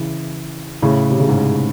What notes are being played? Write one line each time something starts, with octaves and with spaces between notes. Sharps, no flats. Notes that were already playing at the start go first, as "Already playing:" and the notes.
Already playing: C#3 E3
A2 C#3
C3
C#3
G#2 C3